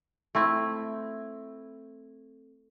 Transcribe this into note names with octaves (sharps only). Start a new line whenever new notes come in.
A3 C4 E4